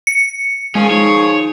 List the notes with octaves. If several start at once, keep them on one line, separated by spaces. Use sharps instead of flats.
C#7
D#3 F3 G#3 C#4 G#4
D#4 C#5